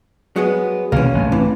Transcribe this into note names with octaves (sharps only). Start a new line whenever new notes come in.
F#3 G#3 B3
B1 C3 E3 A#3 C#4
A1 G2
C3 E3